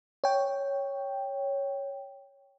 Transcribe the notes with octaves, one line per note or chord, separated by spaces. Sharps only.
C#5 G5